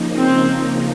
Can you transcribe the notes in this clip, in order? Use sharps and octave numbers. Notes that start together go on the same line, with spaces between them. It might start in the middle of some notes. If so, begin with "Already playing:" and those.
Already playing: C#3 F3 A#3 D#4
C4